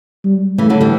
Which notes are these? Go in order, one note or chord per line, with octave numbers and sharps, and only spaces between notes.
G3
C#3 E3 A3
D3 F#3
E3 G3